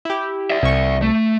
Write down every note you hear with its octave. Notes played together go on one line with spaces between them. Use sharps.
E4 G4
D5 E5
C2 C#6
A3